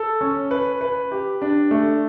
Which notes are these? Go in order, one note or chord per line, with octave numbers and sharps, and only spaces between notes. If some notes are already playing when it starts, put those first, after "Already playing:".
Already playing: A4
C#4
B4
B4
G4
D4
A3